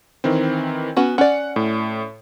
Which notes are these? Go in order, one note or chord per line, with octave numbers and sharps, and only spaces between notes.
D#3 E3 C4
B3 C#4 F#4
C#4 D5 F#5
A2